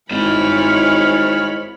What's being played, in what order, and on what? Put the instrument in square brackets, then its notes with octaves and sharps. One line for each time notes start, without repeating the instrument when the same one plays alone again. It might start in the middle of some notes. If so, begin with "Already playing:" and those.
[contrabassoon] G#1 [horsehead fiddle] E4 C#5 [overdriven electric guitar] C5 D#5 [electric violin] B5 F6